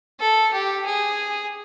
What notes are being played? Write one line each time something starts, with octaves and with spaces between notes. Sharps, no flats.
A4
G4
G#4